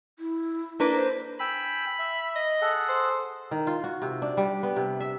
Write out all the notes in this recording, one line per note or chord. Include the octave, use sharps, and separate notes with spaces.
E4
A#3 D4 E4 B4
C5
G5 G#5 B5 E6
E5
D#5
G#4 A4 F#5
C5
D#3
F4
F#4
C3
D4
G3
B3
C3
E5